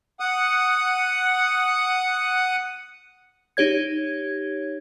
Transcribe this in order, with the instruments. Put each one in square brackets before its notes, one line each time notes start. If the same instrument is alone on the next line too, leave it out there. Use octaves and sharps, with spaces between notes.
[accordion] F#5 D#6
[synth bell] D#4 G4 C#5 G#6